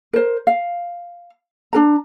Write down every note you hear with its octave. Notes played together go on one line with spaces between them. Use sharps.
A#4 C5
F5
D4 A#4 A#5